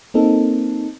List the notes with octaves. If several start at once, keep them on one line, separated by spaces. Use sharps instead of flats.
A#3 C4 D#4 A4 A#4